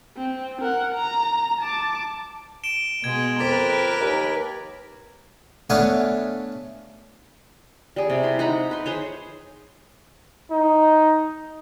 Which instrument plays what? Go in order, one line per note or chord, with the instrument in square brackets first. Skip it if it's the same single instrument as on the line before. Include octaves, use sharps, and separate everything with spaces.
[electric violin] C4
A#4 F#5
A#5
A5 D6
[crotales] D7 E7 G7
[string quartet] B2 G#3 [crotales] G#6
[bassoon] F2 [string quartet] A#4 B4 [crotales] D6 A6 B6
[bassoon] D#2
[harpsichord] A3 B3 D4 C#5 F5 G#5
[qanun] G3 G#4
C3
E4 C6
D#4 F#5 A#5 B5
B4 C6
G#4 C5 C#5
[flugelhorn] D#4